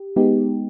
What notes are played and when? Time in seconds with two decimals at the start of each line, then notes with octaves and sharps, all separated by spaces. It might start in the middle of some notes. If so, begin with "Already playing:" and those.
Already playing: G4
0.16 G#3 B3 D#4 G4